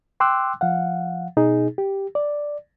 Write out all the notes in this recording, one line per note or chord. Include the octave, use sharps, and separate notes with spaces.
G5 C6 D6 E6 F#6
F3 F5 F#5
B2 D#4 G#4
G4
D5